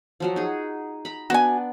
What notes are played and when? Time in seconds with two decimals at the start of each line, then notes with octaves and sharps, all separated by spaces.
0.20 F3 F#3 F#4
0.36 D#4 G#4
1.05 A#5 B5
1.30 B3 D4 F#4 G#5